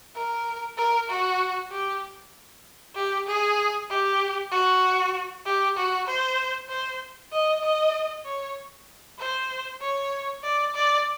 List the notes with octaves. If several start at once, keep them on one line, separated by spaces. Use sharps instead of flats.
A#4
A#4
F#4
G4
G4
G#4
G4
F#4
G4
F#4
C5
C5
D#5
D#5
C#5
C5
C#5
D5
D5